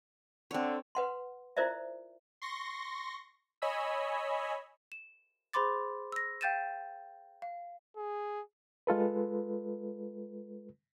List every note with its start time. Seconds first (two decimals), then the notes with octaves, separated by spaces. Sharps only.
0.51 D3 C4 C#5
0.95 B4 F#5 C6
1.57 E4 F4 A#4 C5 D5 E5
2.42 C6 C#6 A#6
3.62 C#5 D#5 G#5 B5 E6
4.92 E7
5.53 G#4 C5 B5 C6 D6 A6
6.12 E6 A#6
6.41 F5 G5 G6 A6 D#7 E7
7.42 F5
7.97 G#4
8.87 G#3 F4 A4 B4